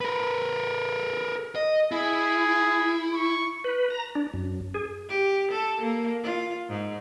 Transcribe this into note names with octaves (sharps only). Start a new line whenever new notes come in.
A#4 B4
D#5
E4 G#4
C#6
B4
A#5
D4
F#2
G#4
G4
A4
A#3
F4
G#2